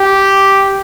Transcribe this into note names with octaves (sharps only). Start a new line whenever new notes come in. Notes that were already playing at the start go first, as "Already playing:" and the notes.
Already playing: G4